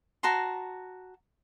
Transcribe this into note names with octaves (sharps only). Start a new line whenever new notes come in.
F#4 A5 A#5 C6